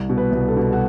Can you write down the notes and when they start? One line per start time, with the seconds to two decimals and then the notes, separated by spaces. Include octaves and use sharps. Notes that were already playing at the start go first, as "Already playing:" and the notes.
Already playing: C2
0.09 B2
0.18 B4
0.32 C2
0.48 A4
0.57 B2
0.73 F#4